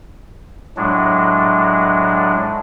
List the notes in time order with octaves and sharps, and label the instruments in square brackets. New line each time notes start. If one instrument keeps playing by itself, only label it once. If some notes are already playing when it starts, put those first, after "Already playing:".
[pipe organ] A2 F#3 G#3 D4